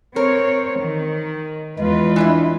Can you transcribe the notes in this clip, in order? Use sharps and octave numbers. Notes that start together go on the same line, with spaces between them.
C4 A#4 C#5
D#3
E2 G#3 F4 B4
E3 D4 E4